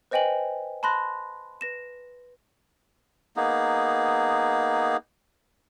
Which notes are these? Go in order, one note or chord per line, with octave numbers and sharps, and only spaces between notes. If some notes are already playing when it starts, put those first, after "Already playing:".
B4 C5 D#5 G5 G#5 F#7
A5 B5 C6 F#6 A#6
B4 A#6 E7
A#3 B3 D#4 G#4